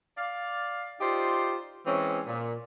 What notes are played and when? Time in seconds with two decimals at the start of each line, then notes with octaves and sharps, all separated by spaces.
0.18 D5 F5
1.01 D#4 F4 G4 C5 D5
1.86 E3 G#3 C4 C#4
2.27 A#2